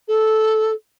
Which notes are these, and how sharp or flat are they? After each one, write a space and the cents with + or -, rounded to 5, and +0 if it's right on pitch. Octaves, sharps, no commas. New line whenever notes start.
A4 -10